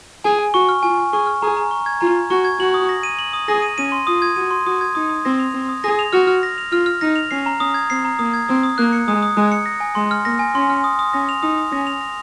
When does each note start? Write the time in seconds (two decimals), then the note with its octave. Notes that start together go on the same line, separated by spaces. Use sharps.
0.24 G#4 G#5
0.39 G#5
0.54 F#4 C#6
0.69 F6
0.83 F4 G#5
0.98 G#5
1.13 G#4 C#6
1.27 F6
1.42 G#4 A#5
1.57 A#5
1.71 C#6
1.86 G#6
2.01 F4 A#5
2.16 A#5
2.30 F#4 C#6
2.45 G#6
2.60 F#4 F#7
2.74 D#6
2.89 A#6
3.03 D#7
3.19 F#7
3.33 D#6
3.48 G#4 A#6
3.62 D#7
3.78 C#4 D#7
3.92 C6
4.07 F4 D#6
4.22 G#6
4.36 F#4 D#7
4.51 C6
4.66 F#4 D#6
4.81 G#6
4.95 D#4 D#6
5.10 D#6
5.25 C4 A#6
5.39 F7
5.54 C4 D#6
5.69 D#6
5.84 G#4 A#6
5.99 F7
6.13 F#4 F6
6.27 F6
6.43 A#6
6.58 F7
6.72 F4 F6
6.86 F6
7.01 D#4 A#6
7.16 F7
7.31 C#4 C7
7.46 A#5
7.60 C#4 D#6
7.74 G#6
7.90 C4 C7
8.05 A#5
8.19 A#3 D#6
8.34 G#6
8.48 C4 D#6
8.63 D#6
8.78 A#3 F#6
8.93 C#7
9.08 G#3 D#6
9.22 D#6
9.36 G#3 F#6
9.52 C#7
9.66 A#6
9.80 G#5
9.95 G#3 C6
10.11 F6
10.25 A#3 A#6
10.39 G#5
10.55 C#4 C6
10.70 F6
10.84 D#6
10.99 D#6
11.13 C#4 A#6
11.29 F7
11.43 D#4 D#6
11.58 D#6
11.72 C#4 A#6
11.87 F7
12.01 A#6